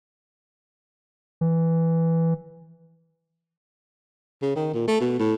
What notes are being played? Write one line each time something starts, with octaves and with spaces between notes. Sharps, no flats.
E3
C#3
D#3
A#2
A3
B2
A2